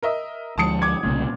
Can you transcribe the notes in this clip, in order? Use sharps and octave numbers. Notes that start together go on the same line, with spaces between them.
A#4 D#5 E5
D2 F3 G#3 A5 D#6 C#7
D6 G#6
C2 A#2 C#3 A3